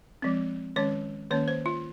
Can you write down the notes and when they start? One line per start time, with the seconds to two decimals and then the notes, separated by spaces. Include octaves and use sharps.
0.22 F3 G#3 C4
0.76 D#3 G#3 C#4 C#5
1.31 D#3 A#3 C#4 C#5
1.48 C5
1.66 F4